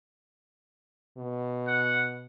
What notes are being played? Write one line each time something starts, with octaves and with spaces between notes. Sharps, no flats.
B2
F#5